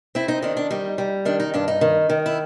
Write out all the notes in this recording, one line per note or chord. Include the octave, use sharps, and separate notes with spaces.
C4 E4
D#4
D#3 D4
D4
G3 D#4
G3
D#3 D4
D#4
G2 D4
D#4
D#3
D#3
E4